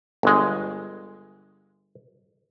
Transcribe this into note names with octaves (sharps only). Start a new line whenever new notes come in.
G1 G#3